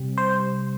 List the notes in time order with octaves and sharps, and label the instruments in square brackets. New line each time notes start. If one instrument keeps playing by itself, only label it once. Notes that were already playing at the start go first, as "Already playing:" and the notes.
Already playing: [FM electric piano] C3 G3 C4
C5